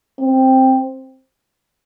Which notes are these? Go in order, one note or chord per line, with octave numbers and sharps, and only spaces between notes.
C4